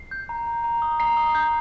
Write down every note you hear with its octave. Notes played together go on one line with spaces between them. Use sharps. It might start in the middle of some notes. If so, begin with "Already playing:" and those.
Already playing: C7
G6
A#5
A#5
A#5
D#6
A#5 C7
D#6
G6